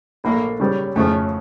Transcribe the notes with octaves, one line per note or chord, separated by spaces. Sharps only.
A#1 A#2 A3 A#3
C#3 G3 C#4
F2 C#3 F3 A3 C#4